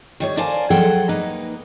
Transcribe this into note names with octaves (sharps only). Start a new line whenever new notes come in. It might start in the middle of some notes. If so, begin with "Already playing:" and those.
D#3 G3 C#5
A#4 C5 D5 F5 G#5 A5
F3 F#3 G#4 A4 F#5 G5
A#3 D#4 B4